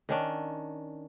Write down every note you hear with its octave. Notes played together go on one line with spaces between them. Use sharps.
D#3 C#4 D4